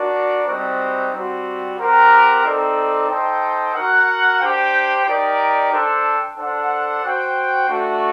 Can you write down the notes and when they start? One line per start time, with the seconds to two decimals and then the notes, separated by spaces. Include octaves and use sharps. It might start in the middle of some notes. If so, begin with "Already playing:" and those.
Already playing: D4 F#4 A#4 D5
0.46 G3 C4 D#4 F#4 C5
1.12 G3 C4 F#4
1.78 C4 G4 A#4 F#5
2.43 C4 D#4 A4 D5
3.09 D#4 A4 C5 G5
3.75 F#4 A#4 F#5
4.40 D4 G4 C5 G5
5.06 D#4 G4 A#4 D5
5.72 D4 A4 C5 G5
6.37 D4 A4 C5 F#5
7.03 F#4 C5 G5
7.68 A3 D4 F#4